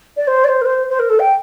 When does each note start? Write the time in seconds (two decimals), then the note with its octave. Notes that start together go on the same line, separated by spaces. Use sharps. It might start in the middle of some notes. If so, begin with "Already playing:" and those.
0.17 D5
0.27 C5
0.44 D5
0.48 C5
0.61 A#4
0.65 C5
0.89 C5
0.99 A#4
1.09 A4
1.19 G5